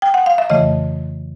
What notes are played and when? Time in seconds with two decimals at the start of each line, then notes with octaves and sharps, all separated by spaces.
0.02 G5
0.14 F#5
0.26 F5
0.38 E5
0.50 F2 C#3 E3 A3 D#5